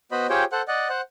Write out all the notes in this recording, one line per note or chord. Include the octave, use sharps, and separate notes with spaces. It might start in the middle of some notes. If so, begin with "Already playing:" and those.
B3 F#4 C5 D#5 B5
F4 G4 G#4 C5 C#5 G5
A4 C5 F#5
D5 D#5 F#5
C5 F#5